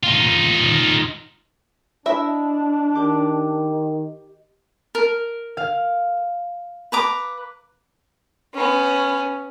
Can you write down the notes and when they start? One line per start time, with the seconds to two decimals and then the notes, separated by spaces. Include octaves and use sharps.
0.03 D#4 F4
2.06 D4 E4 D#5 E5
2.95 D#3 G4 D6
4.95 A#4
5.57 F5
6.92 B4 A#5 D6
8.54 B3 C#4